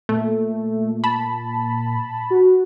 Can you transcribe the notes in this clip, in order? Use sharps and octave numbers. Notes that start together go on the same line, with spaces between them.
A#2 A3
A5 B5
F#4